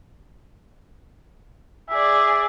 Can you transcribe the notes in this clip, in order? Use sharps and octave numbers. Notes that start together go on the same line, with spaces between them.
G#4 D5 E5